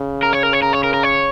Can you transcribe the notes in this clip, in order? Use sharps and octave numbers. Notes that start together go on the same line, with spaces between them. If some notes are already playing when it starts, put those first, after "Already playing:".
Already playing: C#3
A#4
C#5
A#4
C#5
A#4
C#5
A#4
A#4
C#5